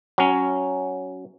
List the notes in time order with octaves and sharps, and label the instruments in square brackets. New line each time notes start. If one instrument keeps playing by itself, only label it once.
[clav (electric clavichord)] F#3 C#4